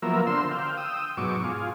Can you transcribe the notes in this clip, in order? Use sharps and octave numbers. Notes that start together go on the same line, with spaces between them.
F3 F#3 A#3 B3 A#4 E5
D3 C5 C6 E6
F5 G5
G5 D#6 E6
G#2 B2 F#3 C#6 D6
F4 G#4